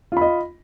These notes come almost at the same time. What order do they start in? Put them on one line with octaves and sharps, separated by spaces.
F4 B5 D#5